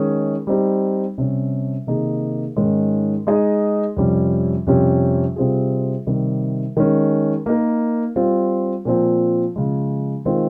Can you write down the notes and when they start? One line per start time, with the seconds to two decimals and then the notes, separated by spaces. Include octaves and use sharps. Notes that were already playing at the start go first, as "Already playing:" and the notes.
Already playing: D#3 G#3 C#4 G#4
0.47 G3 C4 D#4 G4
1.18 C3 G3 C#4
1.87 C3 D#3 A#3 D#4 G#4
2.57 G#2 D#3 G#3 C#4
3.27 G#3 D#4 G#4 D#5
3.96 F2 C3 G3 C#4
4.67 F2 C3 G3 C#4 G4
5.36 C3 G3 C4 F4 G#4
6.07 C3 D#3 G3
6.77 D#3 G#3 C#4
7.46 A#3 D#4 A#4
8.16 G3 C4 F4
8.85 A#2 F3 C4
9.56 C#3 F3 G#3
10.25 D#3 G#3 C4 F4